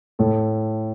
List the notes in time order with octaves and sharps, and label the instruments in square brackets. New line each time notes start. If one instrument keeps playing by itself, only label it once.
[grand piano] A2 A4